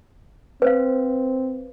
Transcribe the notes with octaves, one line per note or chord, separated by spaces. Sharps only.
C4 B4 C5 F5